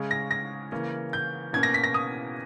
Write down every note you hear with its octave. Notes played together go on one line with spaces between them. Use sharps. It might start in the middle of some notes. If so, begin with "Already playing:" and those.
Already playing: C#3 G#3 C#4
A#6
A#6
C#3 E3 A#3 C#4
G6
B2 A#3 C#4 G#6
A#6
B6
A#6
D#6